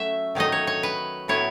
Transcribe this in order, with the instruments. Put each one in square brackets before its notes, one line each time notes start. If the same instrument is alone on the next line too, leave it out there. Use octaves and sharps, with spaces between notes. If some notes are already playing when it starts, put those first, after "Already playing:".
Already playing: [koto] F#3 A3 C#4 E5
D#3 F#3 A3 D#4 D#5
C#5
C#5
B4
A2 F#3 B3 E4 C#5